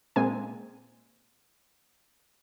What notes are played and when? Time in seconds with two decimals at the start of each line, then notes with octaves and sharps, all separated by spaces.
0.16 A#2 G#3 C4 G#5